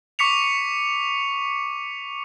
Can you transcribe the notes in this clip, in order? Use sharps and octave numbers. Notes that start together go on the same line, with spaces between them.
C#6 D6 B6 C#7 F7